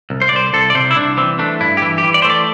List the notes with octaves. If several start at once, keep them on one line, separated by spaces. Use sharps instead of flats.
C2
C5
D5
C2 C5
C2 A4
D5
C3 C5
E4
C2 D4
E3 C4
A3 D4
G2 E4
G4
E3 E4
G4
E3
D5
A3 C5
D5